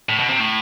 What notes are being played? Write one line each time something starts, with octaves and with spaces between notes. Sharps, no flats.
A2
B2
C3
A2